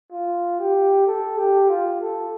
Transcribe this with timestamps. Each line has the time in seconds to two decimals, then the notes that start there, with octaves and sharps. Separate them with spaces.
0.12 F4
0.60 G4
1.07 A4
1.38 G4
1.70 F4
2.01 A4